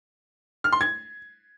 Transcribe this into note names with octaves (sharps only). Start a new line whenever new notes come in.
F6
C6
G#6